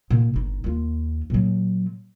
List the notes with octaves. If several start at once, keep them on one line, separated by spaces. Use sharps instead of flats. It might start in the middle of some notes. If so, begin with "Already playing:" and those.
A#2
G1 D#4
D#2 F4
A#2 F#3